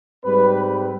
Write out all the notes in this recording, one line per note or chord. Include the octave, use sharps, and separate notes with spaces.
G#2 G3 C4 B4